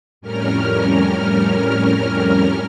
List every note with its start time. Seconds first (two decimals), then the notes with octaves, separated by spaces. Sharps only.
0.21 F2 A2 G3 C#4 A#4 F6